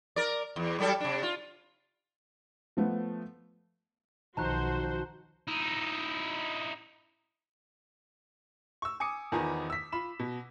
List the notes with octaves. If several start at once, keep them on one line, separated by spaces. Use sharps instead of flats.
A#4 D5
E2
F#3 G3 A4
C3 D4
F4
F3 A3 B3
B1 D#3 F3 F#4 C5 A5 A#5 F#6
D#4 E4
C#6 E6
G#5 D6 D#6 C#7
E2 D#3 F3 B3 G#5 A#5
E6 B6
F4 B5 E7
B2